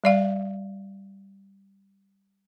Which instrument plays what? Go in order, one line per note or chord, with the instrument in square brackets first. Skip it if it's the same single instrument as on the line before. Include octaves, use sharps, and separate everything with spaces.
[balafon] G3 D5 F5